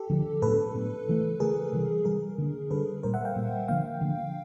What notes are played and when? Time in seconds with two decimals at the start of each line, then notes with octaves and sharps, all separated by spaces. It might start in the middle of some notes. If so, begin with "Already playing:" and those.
Already playing: G4 A4
0.10 D3 F3 A3 D4
0.42 A2 F#3 B3 D4 A4 B4
0.74 A2 F#3 B3 D4
1.08 C#3 E3 A3
1.40 C#3 E3 A3 G#4 A#4
1.73 C3 E3 G3
2.05 C3 E3 G3 G#4 A#4
2.38 D3 G3 A#3 D4
2.71 D3 G3 A#3 D4 A4 B4
3.03 A#2 G3 A#3 A#4 C5
3.14 E5 F#5
3.25 F5 G5
3.36 A#2 G3 A#3
3.68 D3 F3 A#3 F5 G5
4.01 D3 F3 A#3